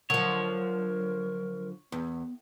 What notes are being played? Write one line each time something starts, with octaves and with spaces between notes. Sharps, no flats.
D3 F3 F#3 A#4 C#5
E2 B3